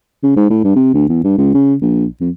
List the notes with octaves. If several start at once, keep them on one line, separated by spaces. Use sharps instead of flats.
C#3
G#2
A2
G2
C3
D2
E2
G2
C#2
C#3
A#1
F2